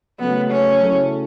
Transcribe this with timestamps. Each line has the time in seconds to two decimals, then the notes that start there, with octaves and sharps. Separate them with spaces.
0.20 C#3 F#3 A3 B3
0.51 C#4
0.83 C#3 F#3 A3 E4 A4